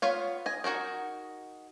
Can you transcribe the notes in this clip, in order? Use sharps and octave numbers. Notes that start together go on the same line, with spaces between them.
B3 F4 C#5 F5
D#5 G#5
D#4 F#4 G#4 A#4